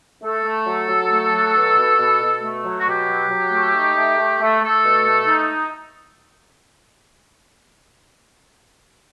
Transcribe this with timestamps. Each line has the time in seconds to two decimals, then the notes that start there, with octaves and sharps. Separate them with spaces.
0.22 A3 A4
0.45 A3
0.67 F#3
0.89 F#3
1.11 A3
1.33 F#3
1.55 B2
1.77 B2
1.99 B2
2.21 B2
2.42 A3
2.65 F#3
2.77 F#4
2.86 B2 G4
3.09 F#3
3.30 F#3
3.52 A3
3.75 D#4
3.96 A3
4.18 A3
4.41 A3
4.62 A3 A4
4.85 B2
5.07 A3
5.28 D#4